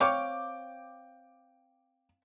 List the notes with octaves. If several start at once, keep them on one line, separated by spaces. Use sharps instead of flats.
C4 C#5 F5 G5 D6